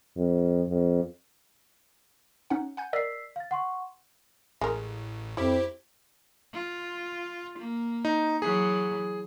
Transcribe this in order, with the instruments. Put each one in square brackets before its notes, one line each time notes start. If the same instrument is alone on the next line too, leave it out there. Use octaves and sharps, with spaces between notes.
[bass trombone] F2
F2
[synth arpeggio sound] C#4 D#4 F#5
F#5 G#5 G6
[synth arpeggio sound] A#4 D5 D#5 [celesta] E6 B6 C7
[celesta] F5 A6
F#5 C6 C#6
[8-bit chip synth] A1 [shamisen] G#3 A#4
[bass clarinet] F2 [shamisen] G3 [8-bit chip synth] E4 G4 [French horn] C5
[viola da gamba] F4
A#3
[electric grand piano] D#4
[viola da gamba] E3 F#3 [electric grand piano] G#4